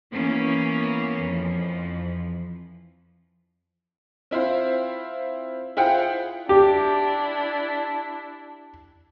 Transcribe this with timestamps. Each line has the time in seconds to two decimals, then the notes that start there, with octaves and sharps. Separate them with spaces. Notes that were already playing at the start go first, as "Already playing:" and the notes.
0.13 E3 A#3 B3 C#4
1.21 F2 E3 F3
4.31 C4 E4 F4 C5
5.77 E4 F4 G#4 C5 F#5 G5
6.49 D4 E4 G4